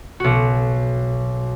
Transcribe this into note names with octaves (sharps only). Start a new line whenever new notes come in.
B1 F#4